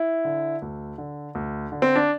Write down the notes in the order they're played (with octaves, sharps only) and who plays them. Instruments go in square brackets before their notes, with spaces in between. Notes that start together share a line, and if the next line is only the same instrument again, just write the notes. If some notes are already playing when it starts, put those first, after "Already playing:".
Already playing: [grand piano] E4
D3
D2
D3
D2
D3
C4
D4